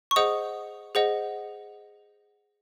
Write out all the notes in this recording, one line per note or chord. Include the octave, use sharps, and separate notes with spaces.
C#6
G#4 C5 D#5 F#5 D#6
G#4 C5 D#5 F#5